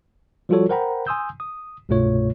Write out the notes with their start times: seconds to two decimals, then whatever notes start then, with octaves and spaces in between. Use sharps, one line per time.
0.49 F3 G3 F4 F#4 A4 C#5
0.69 A#4 C5 F#5 G5 A#5 B5
1.07 G#5 C6 D#6 E6 G6
1.40 D#6
1.89 C2 G2 B2 A3 F4 C#5